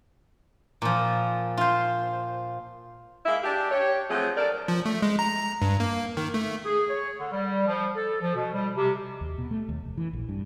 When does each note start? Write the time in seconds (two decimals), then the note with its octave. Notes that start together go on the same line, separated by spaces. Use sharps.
0.82 A#2 F3
1.57 F4 C5
3.26 G#3 A#3 E4 E5
3.44 D4 G4
3.71 G4 C#5
4.10 F3 F#3 A3 C4 G#4
4.37 D4 A4 A#4 D5
4.68 F3
4.86 A3
5.02 G#3
5.19 A#5
5.62 G2
5.80 A#3
6.17 D#3
6.34 A3
6.65 G#4
6.89 C#5
7.19 D3
7.32 G3
7.67 F3
7.96 A4
8.22 F3
8.35 B2
8.54 G3
8.76 C3
9.21 D#2
9.38 B2
9.51 A3
9.69 D#2
9.84 F1
9.97 E3
10.13 A#1
10.29 G2